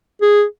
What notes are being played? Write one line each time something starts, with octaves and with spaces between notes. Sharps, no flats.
G#4